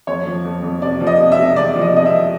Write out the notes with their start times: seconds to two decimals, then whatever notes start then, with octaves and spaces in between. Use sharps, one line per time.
0.07 F2 C#5
0.26 F3
0.44 F2
0.63 F2
0.82 C3 D5
1.00 F3
1.07 D#5
1.19 C3
1.32 E5
1.38 C3
1.56 E2 D5
1.75 F3
1.81 D#5
1.93 C3 D#5
2.06 E5
2.12 F3